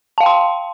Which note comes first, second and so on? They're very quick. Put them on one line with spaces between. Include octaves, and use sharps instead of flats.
A5 F5 G5 C6